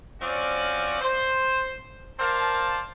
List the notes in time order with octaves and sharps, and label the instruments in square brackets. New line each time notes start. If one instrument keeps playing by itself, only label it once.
[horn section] F3 C4 C#4 F#4 D5
C5
A#4 C5 D5 F5 A5